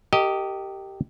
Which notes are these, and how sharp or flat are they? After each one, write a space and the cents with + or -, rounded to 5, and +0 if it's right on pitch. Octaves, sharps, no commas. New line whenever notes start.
G4 -10 A#4 -45 D#5 +5